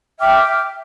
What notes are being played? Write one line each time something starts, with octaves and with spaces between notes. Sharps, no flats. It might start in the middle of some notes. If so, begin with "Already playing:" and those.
E5 G5 D6 F6